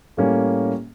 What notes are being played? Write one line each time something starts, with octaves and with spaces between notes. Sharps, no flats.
A2 G3 A#3 C#4